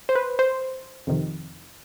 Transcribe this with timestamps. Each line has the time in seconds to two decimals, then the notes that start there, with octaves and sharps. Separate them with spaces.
0.09 C5
0.15 B4
0.39 C5
1.07 F2 C3 D#3